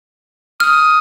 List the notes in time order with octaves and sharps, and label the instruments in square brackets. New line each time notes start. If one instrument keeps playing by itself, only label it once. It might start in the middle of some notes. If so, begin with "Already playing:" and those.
[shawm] D#6 [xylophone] F6